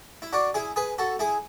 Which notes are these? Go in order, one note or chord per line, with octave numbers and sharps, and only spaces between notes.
E4
D4 F#4
E4 G#4
G#4 B4
F#4 A4
E4 G#4